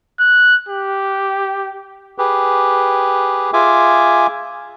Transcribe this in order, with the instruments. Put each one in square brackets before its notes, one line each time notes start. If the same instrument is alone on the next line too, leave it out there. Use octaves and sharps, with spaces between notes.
[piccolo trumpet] F#6
G4
[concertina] G4 G#4 B4
F4 G#4 E5 G#5 D6